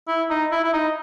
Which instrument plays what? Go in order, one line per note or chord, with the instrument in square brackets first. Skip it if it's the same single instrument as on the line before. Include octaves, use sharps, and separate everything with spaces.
[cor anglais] E4
D#4
E4
E4
D#4